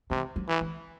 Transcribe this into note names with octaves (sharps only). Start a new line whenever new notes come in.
C3 E3
F#3
E3
E3